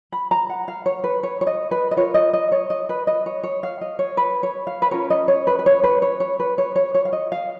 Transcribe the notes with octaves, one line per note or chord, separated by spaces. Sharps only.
B5
A#5
F#5
F5
C#5
B4
C#5
C#5
D#5
B4
D#5
F4 A#4 C#5
D#5
D#5
C#5
D#5
B4
D#5
C#5
C#5
F5
D#5
C#5
B4
C#5
F5
B4
C#4 F4 A#4 C#5
D#5
C#5
B4
B4
C#5
B4
C#5
C#5
B4
C#5
C#5
C#5
F5
D#5
F5